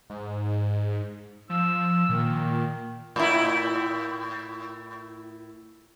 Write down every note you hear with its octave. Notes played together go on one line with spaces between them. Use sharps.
G#2
F3 E6
A#2 D#3
A2 E4